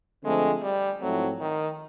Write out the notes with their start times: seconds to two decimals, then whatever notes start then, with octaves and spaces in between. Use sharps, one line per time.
0.24 D3 F3 G#3 A3 C4
0.63 G3
1.02 G#2 F3 F#3 A3 C4 E4
1.40 D#3